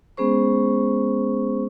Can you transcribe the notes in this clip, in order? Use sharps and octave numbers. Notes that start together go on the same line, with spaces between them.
G#3 B3 C#4 G#4 C5 C#6